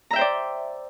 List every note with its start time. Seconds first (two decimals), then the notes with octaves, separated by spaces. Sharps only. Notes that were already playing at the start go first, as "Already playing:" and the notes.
0.11 A#5
0.13 E5
0.16 G5
0.18 C5
0.21 D5